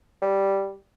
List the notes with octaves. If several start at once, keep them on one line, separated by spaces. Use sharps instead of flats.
G3